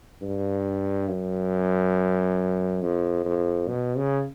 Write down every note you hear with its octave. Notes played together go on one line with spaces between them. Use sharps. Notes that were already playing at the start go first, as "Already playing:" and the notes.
G2
F#2
F2
F2
B2
C#3